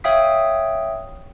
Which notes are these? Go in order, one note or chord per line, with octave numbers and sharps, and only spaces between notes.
C#5 E5 F5 G5 D#6 B6